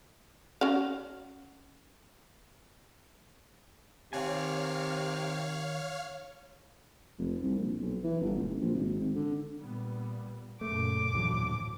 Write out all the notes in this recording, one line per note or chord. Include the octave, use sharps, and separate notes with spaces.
C#4 F#4 F5
C3 D#3 C#5 F5 F#5 G#5 F6
F1
C2
A#1
B1
E3
G1
D#1
A1
A#1
G#1
G#1
D3
A#2 G3 B3
F#2 A#2 C#3 A3 D6
A#1 D#2 A2 D3 E3 F#3